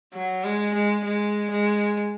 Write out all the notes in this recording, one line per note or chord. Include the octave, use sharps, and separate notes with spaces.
F#3
G#3
G#3
G#3
G#3